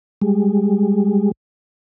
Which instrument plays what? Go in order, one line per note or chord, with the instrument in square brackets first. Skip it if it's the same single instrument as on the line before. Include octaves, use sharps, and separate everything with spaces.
[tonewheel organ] G3 G#3